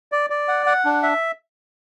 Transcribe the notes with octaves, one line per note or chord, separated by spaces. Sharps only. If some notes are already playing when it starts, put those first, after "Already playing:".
D5
D5
F#5
F#5
D4
E5